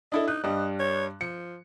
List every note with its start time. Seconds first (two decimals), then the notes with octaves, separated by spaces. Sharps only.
0.12 D4 E4 A4 D#5
0.28 D#4 F#6
0.44 G2 G3 D#5
0.80 C#5
1.21 F3 C#7